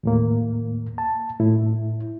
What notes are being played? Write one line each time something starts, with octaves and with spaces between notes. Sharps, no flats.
D#2 A2 A#3
A5
A2 E4